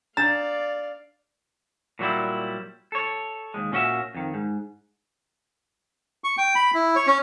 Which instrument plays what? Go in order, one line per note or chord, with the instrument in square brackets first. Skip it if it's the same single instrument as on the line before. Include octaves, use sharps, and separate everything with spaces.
[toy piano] D4 A#5 [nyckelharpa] D5 F5 [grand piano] A6
[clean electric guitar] A#2 F#3 G3 E4
A4 C#5
D#2 G#2 G#3
A#2 C#4 F#4 D#5 E5
F2 D#3
G#2
[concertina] C#6
G5
B5
E4
C#5
C#4